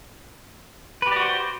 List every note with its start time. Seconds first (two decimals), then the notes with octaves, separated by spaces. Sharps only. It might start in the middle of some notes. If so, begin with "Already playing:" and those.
1.02 B4
1.07 G4
1.12 D5
1.16 F#4
1.21 C5